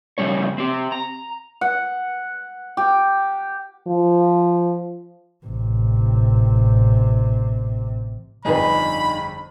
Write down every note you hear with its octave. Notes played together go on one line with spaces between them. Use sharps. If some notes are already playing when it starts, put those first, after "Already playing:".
F2 C#3 F3 G3 C#4 C#5
C4 G4
A#5
F#5
G4
F3
A1 C3
G1 F2 D4 D#4 G#4 B4 B5